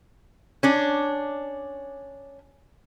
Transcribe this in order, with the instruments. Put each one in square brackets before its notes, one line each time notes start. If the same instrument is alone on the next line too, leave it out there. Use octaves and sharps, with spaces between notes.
[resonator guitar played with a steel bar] C#4 D4